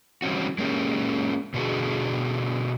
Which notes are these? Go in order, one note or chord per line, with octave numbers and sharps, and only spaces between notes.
E3 G3 C4 C#4 F#4
G#3 A#3 C#4 G4
B2 D3 D4 F4 F#4 G#4